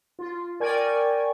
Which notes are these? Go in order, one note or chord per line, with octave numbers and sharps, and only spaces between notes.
F4
A#4 D5 G5 G#5 C#6 G#6